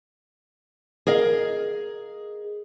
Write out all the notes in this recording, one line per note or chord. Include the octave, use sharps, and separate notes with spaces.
G#4 A#4 D#5 F5